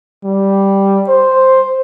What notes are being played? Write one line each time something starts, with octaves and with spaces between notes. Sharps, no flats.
G3
C5